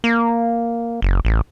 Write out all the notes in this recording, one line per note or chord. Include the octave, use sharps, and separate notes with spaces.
A#3
F#1
A1